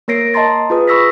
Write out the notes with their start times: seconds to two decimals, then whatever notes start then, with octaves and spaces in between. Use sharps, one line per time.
0.08 A#3 A#4 C#5 A#6 C7 D7
0.34 D#5 A5 A#5 C6 A6
0.70 F4 G#4 B4 D#6
0.87 B5 C#6 E6 A#6 B6